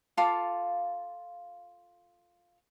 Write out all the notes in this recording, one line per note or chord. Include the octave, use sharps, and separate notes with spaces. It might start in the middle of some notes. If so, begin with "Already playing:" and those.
F4 A4 F5 D6